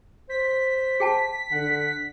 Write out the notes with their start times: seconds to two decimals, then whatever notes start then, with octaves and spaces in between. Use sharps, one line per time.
0.30 C5 B6
1.00 G#4 G5 A5
1.52 D3 F#5